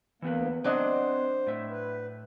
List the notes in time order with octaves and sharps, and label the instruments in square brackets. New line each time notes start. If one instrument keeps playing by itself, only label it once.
[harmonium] D2 A#3 [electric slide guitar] E3 B3 B4
[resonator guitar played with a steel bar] F#3 D4 D#5 [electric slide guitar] C4 F#5 [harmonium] C5
[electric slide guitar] A2 E5
[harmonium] B4